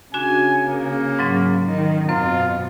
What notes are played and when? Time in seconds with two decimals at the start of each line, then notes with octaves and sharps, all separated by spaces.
0.14 C#3 D4 F#4 G#5
0.64 A#3
1.19 G#2 F#3 C#4
1.65 D#3
2.09 F#2 B2 C4 F4 C5